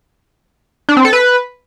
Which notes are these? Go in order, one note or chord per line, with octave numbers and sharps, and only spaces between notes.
D4
C4
A4
B4